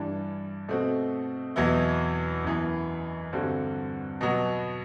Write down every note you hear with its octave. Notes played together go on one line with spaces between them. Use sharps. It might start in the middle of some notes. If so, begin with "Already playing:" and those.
Already playing: G2 E3 G3 D4
B2 A3 C4 F#4
E2 B2 F#3 B3 E4
F#2 E3 B3
G2 D3 G3 C4 F#4
B2 F#3 B3